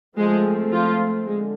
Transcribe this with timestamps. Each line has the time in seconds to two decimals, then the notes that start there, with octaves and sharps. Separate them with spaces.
0.17 F3 G#3 A3 C4 G#4
0.72 F3 F4
1.26 D3 G#3